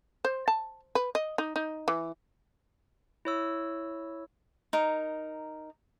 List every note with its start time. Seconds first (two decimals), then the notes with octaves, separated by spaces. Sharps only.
0.25 C5
0.48 A5
0.95 B4
1.15 D#5
1.38 D#4
1.56 D#4
1.88 E3
3.25 E4 C#5 E6
4.73 D#4 A#4